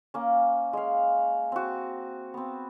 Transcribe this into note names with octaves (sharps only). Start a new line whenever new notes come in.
A#3 C#4
G#3 F5
C4 F#4
B3 C4